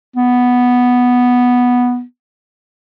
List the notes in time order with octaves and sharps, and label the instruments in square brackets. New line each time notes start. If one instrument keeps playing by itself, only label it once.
[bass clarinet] B3